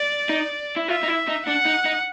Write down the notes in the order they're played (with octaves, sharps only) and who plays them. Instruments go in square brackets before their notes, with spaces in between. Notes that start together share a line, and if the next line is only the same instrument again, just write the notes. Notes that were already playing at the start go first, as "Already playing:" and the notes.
Already playing: [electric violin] D5
[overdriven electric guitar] D#4
E4
[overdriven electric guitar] F4 [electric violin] E5
[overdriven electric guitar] D#4
E4
D#4
[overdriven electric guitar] D4 [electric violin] F#5
[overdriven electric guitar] D#4
D#4